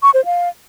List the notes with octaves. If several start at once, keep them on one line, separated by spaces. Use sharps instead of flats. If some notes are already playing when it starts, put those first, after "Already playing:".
C#6
C5
F5